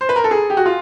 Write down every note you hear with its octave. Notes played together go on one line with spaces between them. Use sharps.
C5
B4
A#4
A4
G#4
G4
F#4
F4